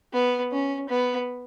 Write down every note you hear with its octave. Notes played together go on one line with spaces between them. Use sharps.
B3
C#4
B3